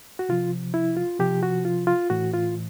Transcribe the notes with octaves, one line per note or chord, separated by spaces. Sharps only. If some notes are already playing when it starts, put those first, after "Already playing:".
F#4
C3 F3 F4
E4
F4
C3 F3 G4
F#4
F4
F4
A2 E3 F#4
F4